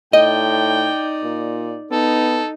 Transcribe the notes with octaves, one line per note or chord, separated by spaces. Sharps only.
A2 D#4 D5 D#5 G5
A#2
B3 D#4 A4